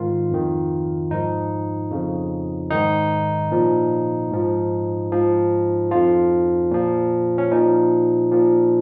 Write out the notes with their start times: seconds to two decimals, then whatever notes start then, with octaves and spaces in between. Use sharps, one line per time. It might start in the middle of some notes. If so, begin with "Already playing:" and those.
Already playing: G#2 D#3 F4
0.31 F2 D#3
1.11 G#2 F3 D#4
1.91 F2 C#3 F3
2.71 G#2 D#3 D#4
3.51 A#2 F3
4.31 G#2 F3
5.12 G#2 F3
5.91 F2 F3 F4
6.71 A#2 F3
7.38 C#4
7.51 A#2 F3 D#4
8.31 A#2 F3